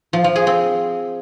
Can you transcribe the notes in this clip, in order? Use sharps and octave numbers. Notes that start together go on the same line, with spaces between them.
F3
F3
G#4
C4